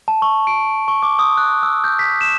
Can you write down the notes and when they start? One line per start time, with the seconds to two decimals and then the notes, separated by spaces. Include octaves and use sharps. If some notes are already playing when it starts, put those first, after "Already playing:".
0.08 A5
0.22 C#6
0.47 D7
0.88 C#6
1.03 D6
1.19 D#6
1.37 F#6
1.63 E6
1.84 G6
1.99 B6
2.21 E7